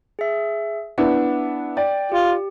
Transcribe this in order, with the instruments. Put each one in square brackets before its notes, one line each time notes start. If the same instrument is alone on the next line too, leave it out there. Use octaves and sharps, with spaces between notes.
[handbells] G#4 E5
[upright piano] B3 D4 E4 [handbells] F#5
[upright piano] D5 [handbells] G5
[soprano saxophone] F4 [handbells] G4